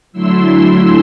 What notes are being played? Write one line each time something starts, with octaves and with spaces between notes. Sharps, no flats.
D3 F#3 A3 E4 C6 E6